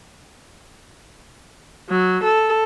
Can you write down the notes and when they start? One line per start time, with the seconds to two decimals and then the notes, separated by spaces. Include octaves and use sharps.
1.90 F#3
2.24 A4